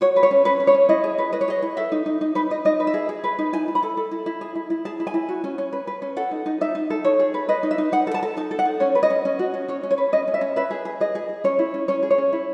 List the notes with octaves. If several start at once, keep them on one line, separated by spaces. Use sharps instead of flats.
F#4 C#5
B4
C#5
C#4
C#4 B4
C#4
C#5
C#4
E4 D#5
G#4
B4
B4 D#5
C#5
G#4 D#5
E4
A4 E5
D#4
D#4
D#4
D#4 B4
D#4 D#5
D#4 D#5
B4
E5
G#4
G#4
B4
D#4
E4 G#5
E4
B5
A4
A4
E4
E4
G#4
E4
E4
G#4 A5
E4
G#5
E4
F#4
C#4
C#4
B4
B4
C#4
A4 F#5
D#4
D#4
D#4 E5
D#4
A4
D#4 C#5
G#4
B4
B4 D#5
D#4
E5
D#4
D#4 F#5
A4
A5
A4
D#4 A5
A4
F#5
D#4
C#4 C#5
B4
D#5
C#4
C#4
F#4
C#4
C#4 C#5
C#4
C#5
B4
C#4 D#5
C#4
E5
C#4
B4 E5
G#4
G#4
G#4 D#5
G#4
G#4
C#4 C#5
E4
C#4
C#4 C#5
G#4
C#5
C#4
E4